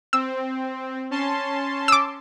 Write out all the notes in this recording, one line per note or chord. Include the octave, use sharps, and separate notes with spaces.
C4 E6
C#4 A5 C6
D6 E6